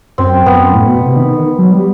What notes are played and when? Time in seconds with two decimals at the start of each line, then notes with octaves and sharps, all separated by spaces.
0.18 F#2 C4
0.46 F#2 B3
0.74 A2
0.88 B2
1.02 C3
1.16 D#3
1.30 D#3
1.59 F#3
1.73 G3